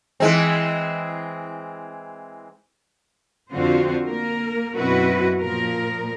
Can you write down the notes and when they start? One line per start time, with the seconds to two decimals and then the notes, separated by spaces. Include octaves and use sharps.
0.20 E3 G#3 C4
3.53 F2 D3 C4 F4 F#4 C5
4.08 A#3 A#4
4.76 F#2 B2 C4 E4 F#4 B4
5.41 A#2 F3 A#4